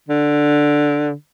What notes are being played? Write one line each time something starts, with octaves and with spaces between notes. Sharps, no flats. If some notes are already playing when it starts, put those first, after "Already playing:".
D3